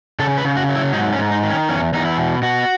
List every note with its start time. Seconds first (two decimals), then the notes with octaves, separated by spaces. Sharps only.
0.19 C#3 A4
0.38 B4
0.45 C#3
0.57 F#4
0.69 F#3
0.75 E4
0.93 G#2 D#4
1.13 C#4
1.18 G#2
1.31 D#4
1.43 D#3
1.50 C#4
1.69 E2 C#4
1.93 E2 D#4
2.05 E4
2.18 B2
2.42 B2 F#4